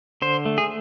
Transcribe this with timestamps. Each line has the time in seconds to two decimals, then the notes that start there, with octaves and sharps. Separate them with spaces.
0.22 D3 C5
0.45 A3
0.58 G#4